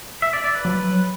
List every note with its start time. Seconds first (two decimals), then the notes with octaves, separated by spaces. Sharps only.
0.22 E5
0.33 D5
0.44 D5
0.55 B4
0.65 F#3